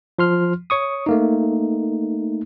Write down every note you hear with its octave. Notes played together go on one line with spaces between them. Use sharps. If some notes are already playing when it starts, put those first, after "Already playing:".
F3 C6 F6
C#5 C#6 D#6
A3 A#3 D#4